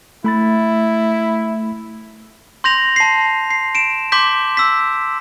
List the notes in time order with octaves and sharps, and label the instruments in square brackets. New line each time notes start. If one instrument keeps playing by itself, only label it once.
[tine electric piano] A3 B5 A6 [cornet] E4
[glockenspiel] C6 G6 A#6 F7
A5 C7
C7
D7 E7
C6 D6 G6 B6
E6 B6